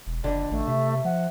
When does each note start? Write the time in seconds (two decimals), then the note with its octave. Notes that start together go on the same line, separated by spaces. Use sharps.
0.07 E1
0.24 F#1 F2 D3 D5
0.51 A1 A3
0.68 C3 E5
1.04 F3 F#5